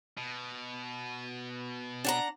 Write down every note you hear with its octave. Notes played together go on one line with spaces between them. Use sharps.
B2
D4 F#5 A#5